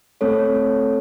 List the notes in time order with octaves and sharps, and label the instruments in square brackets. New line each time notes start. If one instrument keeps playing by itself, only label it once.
[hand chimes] A3 C4 A4 C#5